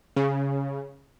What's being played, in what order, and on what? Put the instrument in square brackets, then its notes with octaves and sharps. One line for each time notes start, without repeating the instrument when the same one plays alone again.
[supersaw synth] C#3